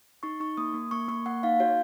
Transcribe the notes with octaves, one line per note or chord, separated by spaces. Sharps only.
D#4 C#6
D#4 C#6
A#3 D#6
A#3
A#3 C#6
A#3 C#6
A#3 F#5
D#4 F5
F#4 C#5